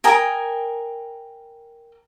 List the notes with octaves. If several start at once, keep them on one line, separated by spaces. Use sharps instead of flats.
A#4 G5 G#5 D#6